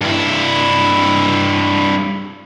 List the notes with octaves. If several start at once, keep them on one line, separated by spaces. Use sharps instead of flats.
G2 E4